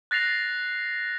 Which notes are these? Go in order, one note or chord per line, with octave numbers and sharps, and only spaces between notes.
F#6 A6 A#6 C7 F7